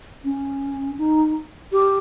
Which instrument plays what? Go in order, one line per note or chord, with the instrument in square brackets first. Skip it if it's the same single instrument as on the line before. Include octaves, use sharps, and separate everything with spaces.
[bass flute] C#4
D#4
G4